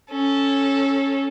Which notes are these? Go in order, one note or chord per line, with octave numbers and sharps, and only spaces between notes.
C#4 A4